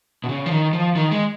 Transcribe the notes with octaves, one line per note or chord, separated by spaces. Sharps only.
B2
C#3
F3
D#3
F3
D#3
G#3